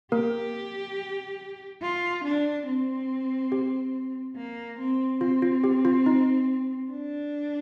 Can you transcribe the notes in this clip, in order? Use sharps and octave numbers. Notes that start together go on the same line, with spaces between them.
A#3 G4 A#4
F4
D4
C4
G4
A#3
C4
C4 F4
F4
G4
F4
D#4
D4